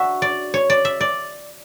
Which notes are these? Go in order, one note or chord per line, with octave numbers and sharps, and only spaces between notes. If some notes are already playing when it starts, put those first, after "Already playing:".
Already playing: D4 F#4 E5
D5
C#5
D5
E5
D5